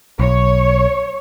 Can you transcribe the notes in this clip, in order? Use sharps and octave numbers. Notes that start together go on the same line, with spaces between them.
B1 C#5